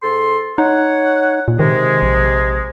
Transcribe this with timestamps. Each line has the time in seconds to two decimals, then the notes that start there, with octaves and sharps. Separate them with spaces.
0.03 G#2 A4 C6
0.58 D#4 C#5 F#5
1.48 A#2
1.59 C3 D#3 G#3
2.02 A#1